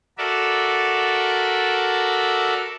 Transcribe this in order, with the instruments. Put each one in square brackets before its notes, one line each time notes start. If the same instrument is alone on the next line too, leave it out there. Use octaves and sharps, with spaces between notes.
[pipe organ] F#4 A4 A#4 D5 E5